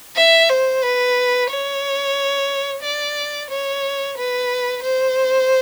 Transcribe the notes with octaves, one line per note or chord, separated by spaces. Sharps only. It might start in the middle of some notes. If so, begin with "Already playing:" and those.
E5
C5
B4
C#5
D5
C#5
B4
C5